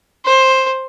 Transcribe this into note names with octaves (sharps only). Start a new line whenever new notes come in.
C5